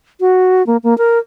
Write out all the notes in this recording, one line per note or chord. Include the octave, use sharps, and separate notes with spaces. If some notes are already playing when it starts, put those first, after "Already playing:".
F#4
A#3
A#3
A#4